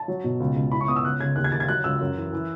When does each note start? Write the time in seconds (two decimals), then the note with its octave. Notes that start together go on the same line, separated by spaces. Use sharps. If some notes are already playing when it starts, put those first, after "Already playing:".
Already playing: A5
0.08 F#3
0.24 B2
0.40 C#2
0.56 C#2
0.71 E4 B5
0.81 C#6
0.88 B3 D#6
0.96 E6
1.04 C#2 F#6
1.20 C#3 G#6
1.36 D#2 F#6
1.44 G#6
1.52 D#3 A6
1.60 G#6
1.68 F#3 F#6
1.84 C#2 E6
2.01 F#2
2.16 E3
2.33 E3